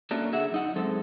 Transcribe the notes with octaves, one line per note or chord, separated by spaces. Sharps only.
A3 A#3 C#4 D4 F#4 A4
D3 G#4 E5 F#5
F#2 D#4 F#5
F#2 G#3 C4 A4